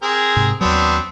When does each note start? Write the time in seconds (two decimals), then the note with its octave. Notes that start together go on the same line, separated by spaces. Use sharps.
0.03 C4 G#4 A#4
0.36 G#2 C3
0.61 D#2 F#3 B3 C4 D4